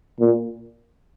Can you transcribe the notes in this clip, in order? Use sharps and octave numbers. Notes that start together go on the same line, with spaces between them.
A#2